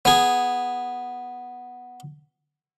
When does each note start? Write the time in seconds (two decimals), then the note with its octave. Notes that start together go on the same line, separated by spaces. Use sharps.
0.05 B3 G#4